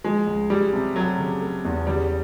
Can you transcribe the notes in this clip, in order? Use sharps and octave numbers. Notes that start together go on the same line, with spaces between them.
F3 G#3
C#2
C#2 G3
C3
F#3 A3
C#3
A3
E2
C#3 G3